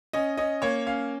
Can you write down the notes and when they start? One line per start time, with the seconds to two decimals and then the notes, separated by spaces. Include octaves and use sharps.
0.13 C#4 D#5
0.37 C#4 D#5
0.62 A#3 C#5
0.87 C#4 F5